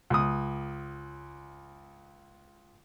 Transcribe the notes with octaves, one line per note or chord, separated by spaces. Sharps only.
C#2 D#6